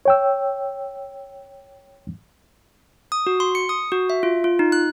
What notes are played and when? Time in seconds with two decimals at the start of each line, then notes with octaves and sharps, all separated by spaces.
0.05 C#5 G5 E6
3.12 D#6
3.27 F#4
3.40 C6
3.55 C#7
3.69 D#6
3.92 F#4
4.10 E5
4.23 F4
4.44 F4
4.59 D#4
4.72 F#6